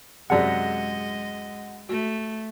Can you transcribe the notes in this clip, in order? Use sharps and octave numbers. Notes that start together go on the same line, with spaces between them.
F#2 C3 G#3 G#4 D5 D#5 F#5
A3 F#4